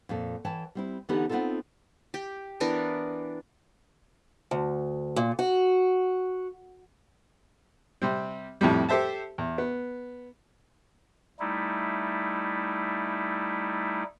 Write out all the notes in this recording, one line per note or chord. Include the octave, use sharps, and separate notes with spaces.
F2 A#2 A4
E3 C#5 G5 A5
G3 C4 E4
D3 E3 B3 D#4 G4 A4
B3 C4 D4 D#4 F4 A4
G4
E3 B3 D4 A#4
D2
A#2
F#4
C3 G3 C4
F2 A2 C3 G3
G4 A4 C5 E5 A5
E2
B3
G3 A3 D#4 E4